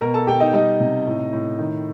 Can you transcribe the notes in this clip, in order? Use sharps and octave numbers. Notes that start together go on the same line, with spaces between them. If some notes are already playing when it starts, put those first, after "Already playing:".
B2 A#4 A#5
A4 A5
B2 G4 G5
D#4 D#5
G3 D#4 D#5
C3
A2
A2
D#3